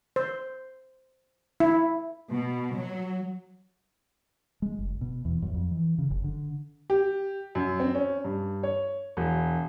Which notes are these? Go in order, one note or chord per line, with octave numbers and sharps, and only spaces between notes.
C5
E4
B2
F#3
G#3
F#1
B2
E2
F#2
F2
E3
C#3
F#1
D3
G4
F#2
C4
C#4
G2
C#5
E1